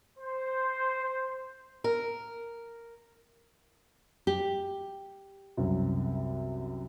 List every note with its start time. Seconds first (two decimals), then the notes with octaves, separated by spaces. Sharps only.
0.18 C5
1.84 A#4
4.27 G4
5.57 C2 F#2 C3